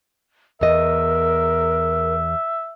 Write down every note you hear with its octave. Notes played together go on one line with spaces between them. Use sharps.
E2 A#4 D#5 E5